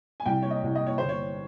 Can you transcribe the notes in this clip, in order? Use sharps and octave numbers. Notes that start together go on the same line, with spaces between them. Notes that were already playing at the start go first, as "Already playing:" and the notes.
G#5
C2 G5
C#5
D#5
C2
D#5
C#5
G1 C5
C#5